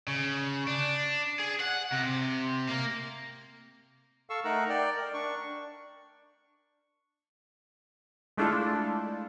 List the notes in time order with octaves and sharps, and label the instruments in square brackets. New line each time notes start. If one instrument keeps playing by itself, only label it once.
[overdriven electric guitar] C#3
D4
G#4
F#5
C3
A#3
[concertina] A4 F5 C#6 E6
A3 D#4 A#4 F#5 A#5
D5 G5
A#4
D4 C#6
[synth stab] G#3 A3 D4 E4 F4 A4